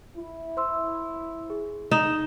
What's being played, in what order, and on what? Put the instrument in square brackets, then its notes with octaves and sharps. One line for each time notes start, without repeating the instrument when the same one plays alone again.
[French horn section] E4
[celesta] C5 C6 E6
G#4
[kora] D#4 [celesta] E7